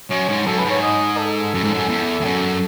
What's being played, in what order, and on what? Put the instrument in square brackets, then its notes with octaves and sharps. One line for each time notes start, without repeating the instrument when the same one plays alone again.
[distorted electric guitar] F#2 [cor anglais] C#5
[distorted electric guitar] G#2
[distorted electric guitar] F#2 [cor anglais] A4
[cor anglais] B4
[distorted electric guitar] G#2
[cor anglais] C#5
D#5
A4
[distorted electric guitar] F#2
G#2
F#2
E2
E2
F#2